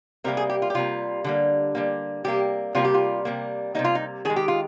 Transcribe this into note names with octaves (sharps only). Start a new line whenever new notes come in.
C3 G3 A#3 A#4
G#4
G4
F4
G4
C3 G3 A#3 F4
D3 G3 A#3
D3 G3 A#3
C3 G3 A#3 G4
C3 G3 A#3 F4
G4
F4
C3 G3 A#3
C3 G3 A#3 D#4
F4
D#4
D#3 G#3 G#4
G4
F4